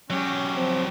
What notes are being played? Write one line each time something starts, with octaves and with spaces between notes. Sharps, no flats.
F#3 C#4 G4
F3 C4